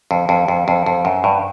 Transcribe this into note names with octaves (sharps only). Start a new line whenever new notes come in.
F2
F2
F2
F2
F2
F#2
G2